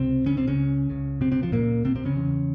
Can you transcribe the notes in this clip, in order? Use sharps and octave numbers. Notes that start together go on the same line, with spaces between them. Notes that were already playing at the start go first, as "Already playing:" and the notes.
Already playing: C#2 C3 C4
C#3 C#4
C3 C4
C#3 C#4
C#2 C#3
C3 C4
C3 C4
F3
A#2 A#3
C3 C4
C3 C4
C#3 C#4
E2 C#3